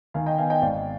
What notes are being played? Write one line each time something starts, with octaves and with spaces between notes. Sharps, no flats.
D#3 F5 G#5
D#5 G5
B3 F5 G#5
D#5 G5
G#1 D5 F5